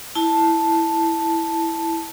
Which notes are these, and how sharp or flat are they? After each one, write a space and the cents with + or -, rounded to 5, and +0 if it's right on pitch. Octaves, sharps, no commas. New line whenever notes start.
E4 +0 A5 +0